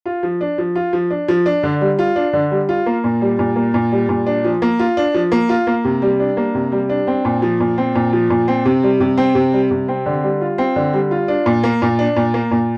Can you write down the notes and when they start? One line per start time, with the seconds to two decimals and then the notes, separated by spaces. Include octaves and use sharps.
0.06 F4
0.23 F3
0.41 D4
0.58 F3
0.75 F4
0.93 F3
1.10 D4
1.28 F3
1.46 D4
1.63 D3
1.81 G3
1.99 F4
2.16 D4
2.33 D3
2.51 G3
2.69 F4
2.86 A#3
3.04 A#2
3.21 G3
3.39 A#2
3.56 A#3
3.74 A#2
3.92 G3
4.09 A#2
4.27 D4
4.44 F3
4.62 A#3
4.79 F4
4.97 D4
5.14 F3
5.32 A#3
5.49 F4
5.67 A#3
5.85 C3
6.02 G3
6.20 D4
6.37 A#3
6.55 C3
6.72 G3
6.90 D4
7.07 C4
7.25 A#2
7.42 F3
7.60 A#2
7.78 C4
7.95 A#2
8.13 F3
8.30 A#2
8.48 C4
8.66 C3
8.83 G3
9.00 C3
9.18 C4
9.35 C3
9.53 G3
9.71 C3
9.88 C4
10.06 D3
10.24 G3
10.41 F4
10.58 C4
10.76 D3
10.94 G3
11.11 F4
11.28 D4
11.46 A#2
11.63 A#3
11.82 A#2
11.99 D4
12.16 A#2
12.34 A#3
12.51 A#2